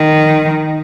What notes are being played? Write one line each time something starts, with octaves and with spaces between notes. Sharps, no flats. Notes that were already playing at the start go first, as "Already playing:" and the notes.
Already playing: D#3